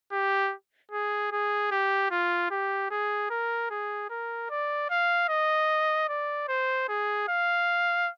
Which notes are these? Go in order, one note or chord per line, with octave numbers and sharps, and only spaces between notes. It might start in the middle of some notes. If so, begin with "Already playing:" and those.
G4
G#4
G#4
G4
F4
G4
G#4
A#4
G#4
A#4
D5
F5
D#5
D5
C5
G#4
F5